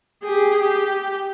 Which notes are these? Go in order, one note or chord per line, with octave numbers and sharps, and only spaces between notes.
G4 G#4
G4